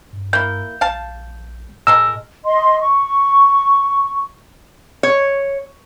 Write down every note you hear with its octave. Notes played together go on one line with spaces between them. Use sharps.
G2
A#3 E4 G6
A#1 F5 A5
A2 G#3 A4 A#4 E6
D#5 C6
C#6
C#5